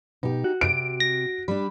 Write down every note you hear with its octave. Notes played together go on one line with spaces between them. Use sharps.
B2 D#4 G4
F#4
C3 D7
A#6
G3 D4 B5